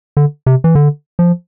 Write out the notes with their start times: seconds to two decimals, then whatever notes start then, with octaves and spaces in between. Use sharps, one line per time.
0.17 D3
0.46 C3
0.64 E3
0.75 D3
1.19 F3